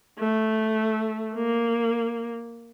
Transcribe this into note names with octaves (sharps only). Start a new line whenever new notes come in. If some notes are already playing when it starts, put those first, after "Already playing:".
A3
A#3